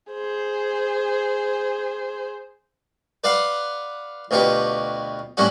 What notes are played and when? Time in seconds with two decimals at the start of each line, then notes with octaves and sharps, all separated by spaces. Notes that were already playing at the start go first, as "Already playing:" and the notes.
0.12 G#4 C5
3.24 B4 D5 F5 F#5 C6
4.31 D2 B2 F4 G4 B4
5.37 A2 F#3 G3 C#4 F#4